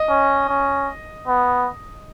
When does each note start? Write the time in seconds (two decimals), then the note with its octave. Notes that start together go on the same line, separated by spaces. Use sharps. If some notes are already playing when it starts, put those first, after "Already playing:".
Already playing: D#5
0.09 C#4
0.49 C#4
1.28 B3